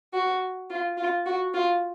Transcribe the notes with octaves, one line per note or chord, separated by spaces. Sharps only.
F#4
F4
F4
F#4
F4